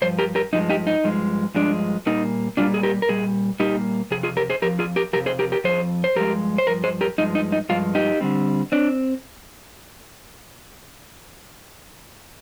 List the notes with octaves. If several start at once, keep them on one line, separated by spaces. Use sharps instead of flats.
G2 F3 C5
G4 A#4
G4 A#4
G2 F3 G#3 D#4
D#4 G4
D#4
G2 F3 G#3
G2 F3 G#3 D4
A#2 G3 A#3 D#4
A#2 G3 A#3 D4 F4
G#4
G4 A#4
A#4
A#2 G3 G#4
A#2 G3 A#3 D#4 G4
F2 C3 G#4
F4 G#4
G4 A#4
G#4 C5
F2 C3 F3 G4 A#4
F4 G#4
G4 A#4
F2 C3 F3 G4 A#4
G#4 C5
G4 A#4
G4 A#4
F2 C3 F3 G#4 C5
C5
G2 F3 G#3 G4 A#4
C5
G2 F3 A#4
G#4 C5
G4 A#4
G2 F3 G#3 D#4
D#4
D#4
G2 F3 G#3 F4
D#4 G4
D3 G3 C4
C4 D4